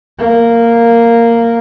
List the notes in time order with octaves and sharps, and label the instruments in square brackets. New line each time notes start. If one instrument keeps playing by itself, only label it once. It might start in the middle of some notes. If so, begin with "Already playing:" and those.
[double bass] A#3